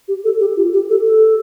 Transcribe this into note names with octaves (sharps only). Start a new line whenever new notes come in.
G4
A4
G4
F4
G4
A4
A4